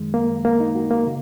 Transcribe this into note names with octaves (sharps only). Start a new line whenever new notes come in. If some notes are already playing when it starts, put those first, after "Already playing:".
Already playing: F#2 D#3 G#3
A#3
A#3
D#4
F#4
A#3
C#3